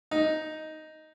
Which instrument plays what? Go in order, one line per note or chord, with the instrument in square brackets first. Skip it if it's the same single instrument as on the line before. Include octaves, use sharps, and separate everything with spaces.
[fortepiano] D#4